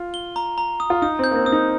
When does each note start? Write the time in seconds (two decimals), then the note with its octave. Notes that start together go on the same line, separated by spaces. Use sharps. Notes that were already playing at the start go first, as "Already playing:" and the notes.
Already playing: F4
0.14 G7
0.36 A#5
0.58 A#5
0.80 D#6
0.90 F4
1.02 D#4 D#6
1.19 C4 G6
1.31 A#3
1.35 C4
1.45 C4 D#6
1.52 D#4